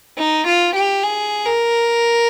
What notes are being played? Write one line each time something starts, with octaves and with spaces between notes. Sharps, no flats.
D#4
F4
G4
G#4
A#4